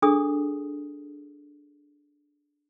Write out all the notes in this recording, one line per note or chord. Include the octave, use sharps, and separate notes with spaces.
D4 G#4 A4 D#6